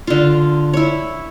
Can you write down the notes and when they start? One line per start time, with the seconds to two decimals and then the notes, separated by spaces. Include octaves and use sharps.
0.07 D3 F4
0.73 E4 C#5